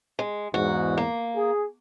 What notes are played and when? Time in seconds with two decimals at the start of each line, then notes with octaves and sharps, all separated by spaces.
0.19 G#3
0.54 E2 G#2 F#4
0.97 A#3
1.36 G#4